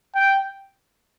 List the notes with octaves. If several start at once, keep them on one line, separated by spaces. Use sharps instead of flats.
G5